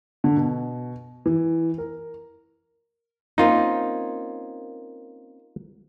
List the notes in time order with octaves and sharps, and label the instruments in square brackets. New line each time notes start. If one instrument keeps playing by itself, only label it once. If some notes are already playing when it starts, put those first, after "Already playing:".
[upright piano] D3
B2
E3
A#4
[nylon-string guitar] A#3 C4 C#4 [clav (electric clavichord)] D#4 F4